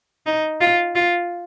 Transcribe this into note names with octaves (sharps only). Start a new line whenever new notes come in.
D#4
F4
F4